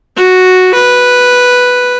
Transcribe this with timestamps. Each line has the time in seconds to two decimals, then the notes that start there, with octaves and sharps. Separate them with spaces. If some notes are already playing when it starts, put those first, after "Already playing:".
0.16 F#4
0.74 B4